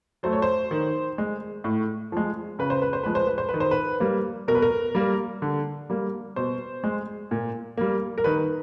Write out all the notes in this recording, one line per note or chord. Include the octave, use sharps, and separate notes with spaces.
F#3 A3 C5
C#5
C5
D#3
G#3
A2
F3 G#3
C#3 B4
C5
B4
C5
F3 G#3 B4
C5
B4
C5
B4
D#3
C5
B4
G3 A#3
B2 A#4
B4
A#4
G3 A#3
D3
G3 A#3
B2 C5
G#3
A#2
G3 A#3
A#4
D#3 B4